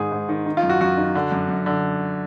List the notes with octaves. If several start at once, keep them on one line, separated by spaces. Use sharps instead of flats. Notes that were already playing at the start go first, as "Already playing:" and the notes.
Already playing: G#2 D#3 G#4
G#2
D#3
D#3
F4
F#2
F#4
F#2 F#4
D#3
D3
F#2
F#2
D3